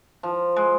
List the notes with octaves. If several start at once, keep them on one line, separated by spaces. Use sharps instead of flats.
F3
G#3